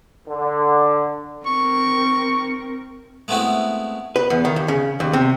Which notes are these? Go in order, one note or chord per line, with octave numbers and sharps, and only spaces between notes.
D3
C4 A#4 C#6
G#3 A3 B3 C4 E4 F#4
B4
E2
D#3
D#2
C#3
D#2
C3